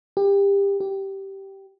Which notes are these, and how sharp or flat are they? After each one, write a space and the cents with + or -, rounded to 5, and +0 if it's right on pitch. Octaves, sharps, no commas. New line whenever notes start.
G4 +25
G4 -10